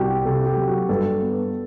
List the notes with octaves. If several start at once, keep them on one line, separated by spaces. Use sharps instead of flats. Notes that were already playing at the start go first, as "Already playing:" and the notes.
Already playing: C2 F#4 G4
C3 A4
G4
F#3
F#4
G2 A4
B3